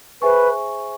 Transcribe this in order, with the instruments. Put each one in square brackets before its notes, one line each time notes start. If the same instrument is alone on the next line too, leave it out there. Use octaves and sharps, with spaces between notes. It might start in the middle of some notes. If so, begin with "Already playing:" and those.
[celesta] G#4 C5 E5 G#5 C#6 [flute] B4